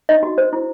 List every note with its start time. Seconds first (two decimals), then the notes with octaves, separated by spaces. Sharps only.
0.09 D#4 D#5
0.23 F#4
0.38 C5
0.53 E4